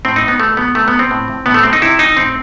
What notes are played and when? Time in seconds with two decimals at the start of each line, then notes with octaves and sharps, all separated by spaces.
0.05 A2 C4
0.16 D#4
0.22 F#3
0.28 B3
0.40 B2 A3
0.57 F#3 B3
0.75 C3 A3
0.88 B3
0.94 F#3
0.99 C4
1.11 A2
1.28 E3
1.46 A2 B3
1.54 A3
1.63 F#3 C4
1.73 D#4
1.82 C3 E4
1.99 E3 D#4
2.17 A2 C4